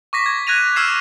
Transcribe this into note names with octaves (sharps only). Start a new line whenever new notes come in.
C#6 D6 A#6 B6
G#6
F#6 G#6 A#6 D#7 F7
D6 E6 F6 G#6 C7 E7